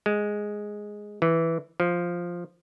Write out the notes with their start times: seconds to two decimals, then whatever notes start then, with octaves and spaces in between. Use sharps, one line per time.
0.06 G#3
1.22 E3
1.80 F3